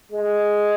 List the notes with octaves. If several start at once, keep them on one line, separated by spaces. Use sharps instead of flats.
G#3